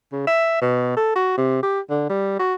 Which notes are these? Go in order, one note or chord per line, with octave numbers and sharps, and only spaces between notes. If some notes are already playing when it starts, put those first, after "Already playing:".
C#3
E5
B2
A4
F#4
C3
G4
D3
G3
F#4